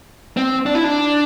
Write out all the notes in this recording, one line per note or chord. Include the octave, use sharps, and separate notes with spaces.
C4
D4
E4
D4